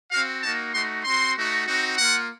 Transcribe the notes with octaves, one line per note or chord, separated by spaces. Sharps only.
C4 F#4 F5
A#3 D#4 F#4 A5
A3 D#4 F#4 C6
C4 F#4 C6
A3 D#4 F#4
C4 D#4 F#4
A#3 F4 F#5